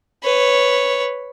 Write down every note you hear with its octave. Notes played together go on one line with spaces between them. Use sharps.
B4 C#5